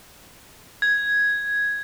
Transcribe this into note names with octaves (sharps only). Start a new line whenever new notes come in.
G#6